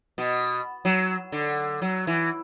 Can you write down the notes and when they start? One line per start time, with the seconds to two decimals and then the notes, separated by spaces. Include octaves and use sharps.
0.18 B2
0.85 F#3
1.32 D3
1.82 F#3
2.07 E3